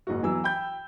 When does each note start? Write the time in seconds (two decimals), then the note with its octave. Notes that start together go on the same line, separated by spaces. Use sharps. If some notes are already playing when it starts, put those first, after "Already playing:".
0.07 F#1 G#2 F#4
0.22 E2 E3 F#3 E6
0.44 G5 B5 G6